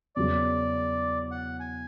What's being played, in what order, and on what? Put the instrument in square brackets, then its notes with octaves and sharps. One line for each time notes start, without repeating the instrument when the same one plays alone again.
[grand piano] E2 C#3 F#3 [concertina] D5
[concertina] F#5
G#5